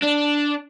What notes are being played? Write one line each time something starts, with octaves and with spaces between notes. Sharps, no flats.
D4